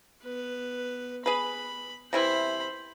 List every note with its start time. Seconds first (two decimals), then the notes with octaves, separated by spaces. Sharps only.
0.24 B3 B4
1.26 G#4 B4 B5
2.13 C3 E3 E4 C5 B5